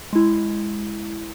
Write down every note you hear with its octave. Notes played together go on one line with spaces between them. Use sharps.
G#3 E4